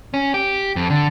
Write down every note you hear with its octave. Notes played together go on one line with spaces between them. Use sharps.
C#4
G4
F2
D3